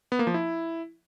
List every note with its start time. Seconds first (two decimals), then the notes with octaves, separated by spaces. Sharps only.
0.12 B3
0.19 A#3
0.27 F3
0.34 E4